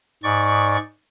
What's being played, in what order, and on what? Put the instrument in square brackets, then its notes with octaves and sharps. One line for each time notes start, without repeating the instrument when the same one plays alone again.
[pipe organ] G#2 D5 C#6